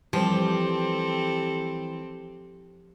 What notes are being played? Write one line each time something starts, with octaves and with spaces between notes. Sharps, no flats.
E3 F3 G3 C4 G4 A4